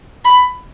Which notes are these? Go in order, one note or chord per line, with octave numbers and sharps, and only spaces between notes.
B5